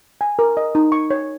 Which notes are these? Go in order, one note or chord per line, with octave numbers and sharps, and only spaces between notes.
G#5
A#4
D#5
D#4
C#6
C#5